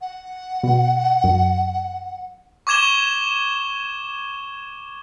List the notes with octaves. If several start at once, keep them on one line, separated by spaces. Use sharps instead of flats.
F#5
B2
F#2
C#6 D6 G#6 E7 G7